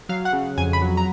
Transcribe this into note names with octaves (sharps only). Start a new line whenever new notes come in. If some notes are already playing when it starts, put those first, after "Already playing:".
F#3 F5
F#5
C#3
F2 G#5
B5
F#3
A#5